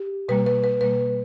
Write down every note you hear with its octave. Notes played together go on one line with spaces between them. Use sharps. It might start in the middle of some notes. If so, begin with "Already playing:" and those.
Already playing: G4
B2 G3 A#3 B4
B4
B4
B2 G3 A#3 B4